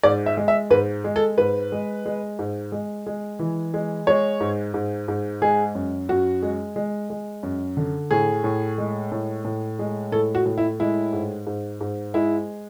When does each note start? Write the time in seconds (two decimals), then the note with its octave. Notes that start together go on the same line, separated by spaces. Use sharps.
0.03 G#2 D5
0.26 E5
0.37 G#3
0.48 E5
0.71 G#2 B4
1.04 G#3
1.16 A4
1.38 G#2 B4
1.72 G#3
2.06 G#3
2.39 G#2
2.72 G#3
3.06 G#3
3.39 E3
3.74 G#3
4.07 G#3 C#5
4.41 G#2
4.74 G#2
5.08 G#2
5.42 G#3 G#4
5.75 F#2
6.09 F#2 F#4
6.42 G#3
6.76 G#3
7.10 G#3
7.43 F#2
7.77 D3
8.11 A2 G#4
8.44 A2
8.78 G#3
9.12 A2
9.45 A2
9.79 G#3
10.12 A2 A4
10.35 F#4
10.46 A2
10.58 E4
10.80 G#3 E4
11.13 G#2
11.47 G#2
11.81 G#2
12.14 G#3 E4